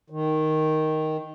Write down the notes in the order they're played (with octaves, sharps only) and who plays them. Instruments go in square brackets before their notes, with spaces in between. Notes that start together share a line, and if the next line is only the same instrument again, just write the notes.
[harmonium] D#3